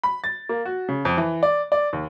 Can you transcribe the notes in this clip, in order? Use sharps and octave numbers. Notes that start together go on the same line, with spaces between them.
B5
A6
A#3
F#4
C#3
F2
E3
D5
D5
D#2